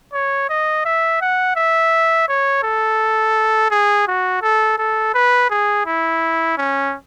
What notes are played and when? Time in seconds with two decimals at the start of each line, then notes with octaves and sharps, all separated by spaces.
0.13 C#5
0.49 D#5
0.85 E5
1.21 F#5
1.56 E5
2.28 C#5
2.63 A4
3.71 G#4
4.08 F#4
4.42 A4
4.78 A4
5.14 B4
5.50 G#4
5.86 E4
6.58 C#4